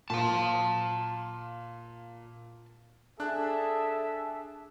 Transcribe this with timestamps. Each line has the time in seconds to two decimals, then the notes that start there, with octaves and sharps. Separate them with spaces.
0.10 A#2 F5 A5
3.20 D4 G#4 A4 E5 A5 F#6